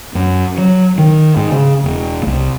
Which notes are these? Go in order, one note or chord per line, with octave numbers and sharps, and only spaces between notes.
F#2
F#3
D#3
G#2
C#3
E1
C2